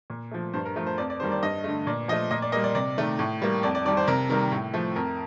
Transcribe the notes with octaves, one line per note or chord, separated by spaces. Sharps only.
A#2
F3 A3
G2 C5
A#4
F3 A3 A#4
C5
F2 D5
D5
D#3 G3 A#3 C5
D5
G2 D#5
D3 A3
A#2 D5
F3 A3 D#5
A#2 D#5
D5
G3 A#3 D#5
D5
C3 D5
D#3 A3
A2
G3 A#3
F2 D5
D5
D#3 G3 D5
C5
C3 A#4
D#3 G3 A#3 A#4
A2
F3 A3
F2 A#4